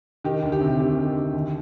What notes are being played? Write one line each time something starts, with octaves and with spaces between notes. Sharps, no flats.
D#3 G4
D2
G4
C3
D2 G4
D#3
D2
D#2